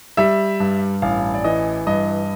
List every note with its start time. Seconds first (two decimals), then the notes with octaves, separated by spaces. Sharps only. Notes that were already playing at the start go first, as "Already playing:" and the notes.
0.17 G3 E5
0.60 G2
1.02 A1 F5
1.34 D5
1.44 E3 D#5
1.87 G2 D#5